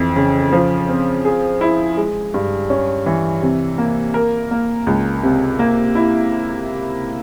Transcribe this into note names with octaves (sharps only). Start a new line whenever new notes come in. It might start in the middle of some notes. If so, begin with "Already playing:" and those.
Already playing: F2 E3
C#3
F3
C4
G#4
E4
G#3
G2
C#4
E3
C3
A#3
A#4
A#3
C#2
C3
A#3
E4